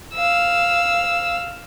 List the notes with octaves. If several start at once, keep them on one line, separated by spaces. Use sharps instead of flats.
F5 E6